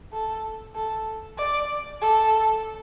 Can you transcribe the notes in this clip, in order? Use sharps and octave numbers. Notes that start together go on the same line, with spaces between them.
A4
A4
D5
A4